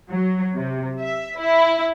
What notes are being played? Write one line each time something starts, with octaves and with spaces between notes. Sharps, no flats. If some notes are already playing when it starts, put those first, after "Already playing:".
F#3
C3
E5
E4